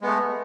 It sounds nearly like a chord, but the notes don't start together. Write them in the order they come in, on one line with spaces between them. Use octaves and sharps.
G#3 B3 A3